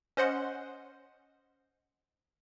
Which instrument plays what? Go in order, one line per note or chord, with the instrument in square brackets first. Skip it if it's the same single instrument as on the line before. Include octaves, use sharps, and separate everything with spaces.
[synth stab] C#4 C5 D#5 F#5 C6